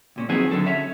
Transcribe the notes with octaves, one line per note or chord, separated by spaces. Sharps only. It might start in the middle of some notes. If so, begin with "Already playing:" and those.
C#2 A#2 C#4
D#3 F3 F#3 B3 C4 G#4
D3 F#3 A4
C#4 C#5 E5